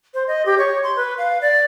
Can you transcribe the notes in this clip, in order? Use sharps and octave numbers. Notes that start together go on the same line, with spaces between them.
C5
D#5
G4
C#5
C6
B4
F5
D5